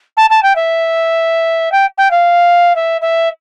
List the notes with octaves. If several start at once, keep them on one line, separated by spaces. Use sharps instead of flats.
A5
A5
G5
E5
G5
G5
F5
E5
E5